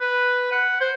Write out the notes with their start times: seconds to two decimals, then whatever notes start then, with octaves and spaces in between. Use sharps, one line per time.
0.01 B4
0.52 F#5
0.80 C5